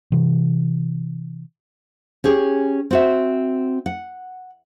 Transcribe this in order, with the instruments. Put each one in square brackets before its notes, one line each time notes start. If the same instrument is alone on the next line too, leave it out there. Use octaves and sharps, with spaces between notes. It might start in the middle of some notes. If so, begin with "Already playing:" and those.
[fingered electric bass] C3 E3
[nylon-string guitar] C#4 G4 G#4
C4 F#4 E5
F#5